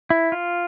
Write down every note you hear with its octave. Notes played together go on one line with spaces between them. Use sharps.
E4
F4